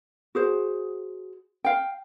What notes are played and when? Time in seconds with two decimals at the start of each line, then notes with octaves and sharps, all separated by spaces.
0.35 F#4 G#4 C5
1.64 F5 G5